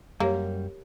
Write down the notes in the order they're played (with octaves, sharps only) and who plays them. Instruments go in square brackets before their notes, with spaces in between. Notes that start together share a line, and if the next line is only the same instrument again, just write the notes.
[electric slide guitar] F#2 G3 [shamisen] A#3 [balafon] G4 A#4 C#5